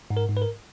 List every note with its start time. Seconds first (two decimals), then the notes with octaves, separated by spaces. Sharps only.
0.10 G#2
0.17 A#4
0.29 G#2
0.37 B4
0.42 A#4